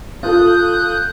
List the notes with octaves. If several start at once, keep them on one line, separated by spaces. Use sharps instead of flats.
F4 A4 F5 D#6 F#6 G6